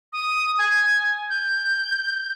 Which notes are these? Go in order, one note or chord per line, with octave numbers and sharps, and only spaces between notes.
D#6
G#5
G6